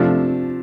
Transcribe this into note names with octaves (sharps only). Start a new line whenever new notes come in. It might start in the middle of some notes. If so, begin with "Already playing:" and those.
Already playing: C3 F3 A3 D4